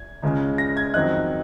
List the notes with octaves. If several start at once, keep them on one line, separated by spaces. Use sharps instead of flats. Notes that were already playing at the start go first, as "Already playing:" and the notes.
Already playing: G#6
C#2 C#3 G#3 C#4
A#6
G#6
F2 D#3 F#3 C4 D#4 F#6